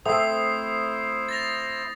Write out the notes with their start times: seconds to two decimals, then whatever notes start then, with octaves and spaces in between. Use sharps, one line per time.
0.06 A3 C4 E4 C5 D#6 C7
1.29 A6 A#6 F7